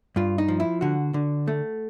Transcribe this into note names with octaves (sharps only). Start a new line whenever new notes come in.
G2 F4
D#4
F3
E4
D3 F#4
D3
A3